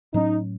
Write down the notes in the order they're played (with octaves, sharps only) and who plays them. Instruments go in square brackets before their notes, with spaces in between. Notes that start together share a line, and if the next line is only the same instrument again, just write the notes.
[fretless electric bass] A2 F#3 C#4 [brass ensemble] D#4